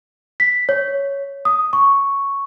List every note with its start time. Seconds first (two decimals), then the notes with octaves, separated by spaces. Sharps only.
0.40 B6
0.69 C#5
1.45 D#6
1.73 C#6